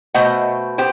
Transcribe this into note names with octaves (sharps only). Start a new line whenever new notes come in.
B2 A3 C5 D#5 F#5
B3 G4 C5 G5